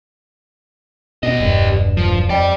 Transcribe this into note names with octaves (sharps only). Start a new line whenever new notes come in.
B2 G4 D#5
E1 G2
F3
F2 D5 G5